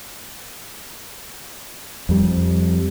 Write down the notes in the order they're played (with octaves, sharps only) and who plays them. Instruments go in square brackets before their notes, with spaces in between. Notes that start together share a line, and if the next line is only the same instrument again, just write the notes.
[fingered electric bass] F2 G3